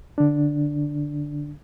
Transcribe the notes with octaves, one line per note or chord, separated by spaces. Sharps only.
D3 D4